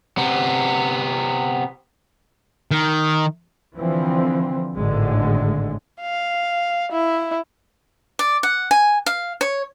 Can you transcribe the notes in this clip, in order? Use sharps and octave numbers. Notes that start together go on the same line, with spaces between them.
C3 B3
D#3
D3 E3 F3 C4
G#1 A2 D3 G#3
F5
E4
D5
F#5
G#5
F5
C#5